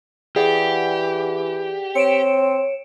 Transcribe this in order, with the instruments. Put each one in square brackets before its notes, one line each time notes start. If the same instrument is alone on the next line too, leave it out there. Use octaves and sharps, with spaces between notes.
[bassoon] E3 [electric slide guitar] G4 [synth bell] G#4 D5 F#5
[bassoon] C4 [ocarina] C#5 [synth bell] C#7 D7 E7